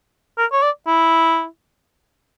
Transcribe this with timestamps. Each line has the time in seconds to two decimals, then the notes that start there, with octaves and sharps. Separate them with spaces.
0.38 A#4
0.52 C#5
0.63 D5
0.87 E4